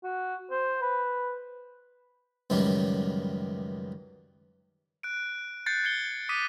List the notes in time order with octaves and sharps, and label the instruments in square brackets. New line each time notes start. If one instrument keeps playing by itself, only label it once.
[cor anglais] F#4
C5
B4
[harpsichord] C#2 F#2 D#3 E3 G3
[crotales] F#6 D7
F#6 G6 A6 C7 C#7
G#6 C7 C#7 G7
D6 D#6 B6 D#7